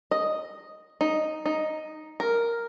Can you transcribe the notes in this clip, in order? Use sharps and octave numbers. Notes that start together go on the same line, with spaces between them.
D#5
D#4
D#4
A#4